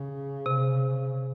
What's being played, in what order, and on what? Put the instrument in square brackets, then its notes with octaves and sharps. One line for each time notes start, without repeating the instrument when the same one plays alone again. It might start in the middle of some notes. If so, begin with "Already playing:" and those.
Already playing: [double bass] C#3
[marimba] C3